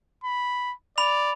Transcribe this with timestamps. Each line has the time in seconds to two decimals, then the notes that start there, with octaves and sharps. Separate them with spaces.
0.24 B5
0.98 D5 B5 F7